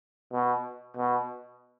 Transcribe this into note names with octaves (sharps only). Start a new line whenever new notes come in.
B2
B2